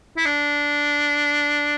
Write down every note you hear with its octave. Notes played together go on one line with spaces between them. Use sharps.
E4
D4